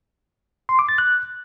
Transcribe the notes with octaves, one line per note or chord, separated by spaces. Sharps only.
C6
D6
A6
F#6